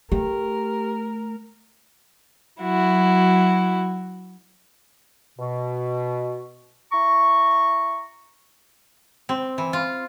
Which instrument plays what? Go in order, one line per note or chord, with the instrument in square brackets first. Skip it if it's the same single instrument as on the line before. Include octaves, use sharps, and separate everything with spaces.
[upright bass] A3 [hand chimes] G4 [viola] A#4
[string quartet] F#3 E4 F#4
[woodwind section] B2
E4 A#5 C#6
[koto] C4
E3
F4